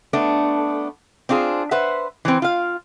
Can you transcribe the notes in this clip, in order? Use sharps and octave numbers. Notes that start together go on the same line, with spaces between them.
A3 B3 D4
C4 D4 F4 G#4
B4 C5 E5 F#5
E3 C4
F4 F5